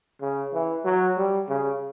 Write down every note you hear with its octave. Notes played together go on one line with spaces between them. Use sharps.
C#3
E3
F#3
G3
C#3